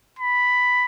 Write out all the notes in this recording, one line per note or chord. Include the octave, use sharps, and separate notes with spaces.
B5